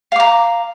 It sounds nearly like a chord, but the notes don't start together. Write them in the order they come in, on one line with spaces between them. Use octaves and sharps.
F5 D6 A#5